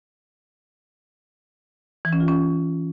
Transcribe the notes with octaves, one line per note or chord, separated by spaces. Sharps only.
E3
C#4
F4
C#4